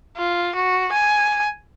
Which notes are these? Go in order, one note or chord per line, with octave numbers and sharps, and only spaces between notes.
F4
F#4
G#5